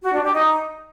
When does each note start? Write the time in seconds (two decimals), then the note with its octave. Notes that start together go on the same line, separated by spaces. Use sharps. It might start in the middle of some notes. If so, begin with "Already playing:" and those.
0.03 F#4
0.13 D4
0.23 G4
0.33 D#4